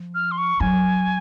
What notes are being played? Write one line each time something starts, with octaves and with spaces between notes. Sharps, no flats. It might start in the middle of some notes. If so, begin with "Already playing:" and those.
Already playing: F3
F6
C6
C#6
F#3 G#5